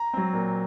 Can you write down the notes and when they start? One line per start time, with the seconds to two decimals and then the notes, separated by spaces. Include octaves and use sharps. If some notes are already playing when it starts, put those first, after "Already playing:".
Already playing: A#5
0.13 F#3 C4
0.33 A#2